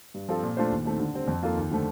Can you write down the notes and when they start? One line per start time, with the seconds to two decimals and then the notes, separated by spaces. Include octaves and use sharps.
0.14 G2
0.29 F3 C4 F4 A4
0.43 A#2
0.57 A3 D4 F4 C5
0.71 D#2
0.86 D#3 A3 C4
1.00 D3
1.14 G3 C4
1.28 F2
1.43 D#3 A#3 F4 A4
1.57 D#2
1.71 D3 F3 A3